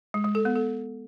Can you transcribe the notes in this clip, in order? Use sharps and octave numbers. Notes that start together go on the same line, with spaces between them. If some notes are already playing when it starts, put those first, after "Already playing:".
G#3
G#3
A4
B3
A4